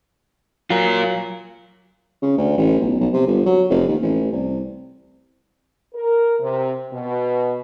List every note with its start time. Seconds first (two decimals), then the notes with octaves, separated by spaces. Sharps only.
0.70 F#3 F4 A#4
2.22 C#3
2.37 D2
2.57 A1
2.80 B1
3.00 B1
3.13 C3
3.27 G1
3.46 F#3
3.69 F1
3.88 D#2
4.02 A1
4.32 C2
5.94 A#4
6.39 C3
6.91 B2